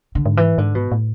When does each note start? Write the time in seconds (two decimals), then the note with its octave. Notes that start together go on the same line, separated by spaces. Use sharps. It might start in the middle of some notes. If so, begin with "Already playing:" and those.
0.15 D3
0.26 G#2
0.37 E3
0.58 G#2 D3
0.75 B2
0.92 A2